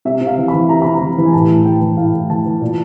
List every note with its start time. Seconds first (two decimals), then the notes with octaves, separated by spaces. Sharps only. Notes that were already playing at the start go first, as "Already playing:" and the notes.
0.05 C3 E5
0.21 C3
0.27 F5
0.37 E3
0.48 E3 B5
0.69 C3 A#5
0.82 C3 B5
0.94 A#5
1.01 E3
1.18 E3
1.25 G#5
1.33 A2 A5
1.50 A2
1.65 E3 G5
1.81 E3
1.97 A2 F5
2.13 A2
2.29 E3 A5
2.45 E3
2.61 A#2